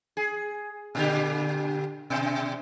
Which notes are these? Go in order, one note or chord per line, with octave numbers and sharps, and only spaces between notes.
G#4
A#2 D3 G4
B2